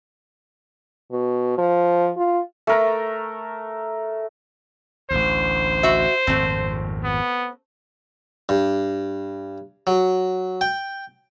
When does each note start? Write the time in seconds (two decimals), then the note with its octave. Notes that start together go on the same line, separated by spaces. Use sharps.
1.11 B2
1.58 F3
2.17 F4
2.67 A3 A#4 A#5
5.11 A1 D2 C5
5.83 F#4 E5
6.27 G#1 F2 A#2 A3 C4
7.04 B3
8.49 G2
9.87 F#3
10.61 G5